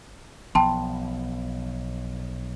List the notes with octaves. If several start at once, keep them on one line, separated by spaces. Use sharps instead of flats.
B1 F3 B3 G5 A5 C6